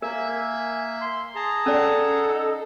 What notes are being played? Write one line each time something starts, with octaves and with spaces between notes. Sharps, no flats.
A#3 A#4 E5 G#5
C6
G#4 A5 A#5
C#4 A4 D5 F#5
D#4